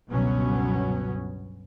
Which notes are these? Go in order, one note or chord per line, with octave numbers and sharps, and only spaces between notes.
G1 C#2 B2 F#3 B3 C#4